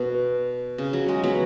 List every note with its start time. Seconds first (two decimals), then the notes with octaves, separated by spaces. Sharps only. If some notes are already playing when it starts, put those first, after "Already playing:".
Already playing: B2
0.78 C#3
0.93 F#3
1.08 G#3
1.23 F#3 B3